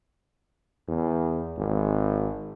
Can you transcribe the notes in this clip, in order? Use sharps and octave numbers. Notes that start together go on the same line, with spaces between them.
E2
G#1